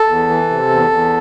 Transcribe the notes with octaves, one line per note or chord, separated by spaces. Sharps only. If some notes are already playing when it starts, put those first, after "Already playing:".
Already playing: A4
E2
E3
C3
E2
E2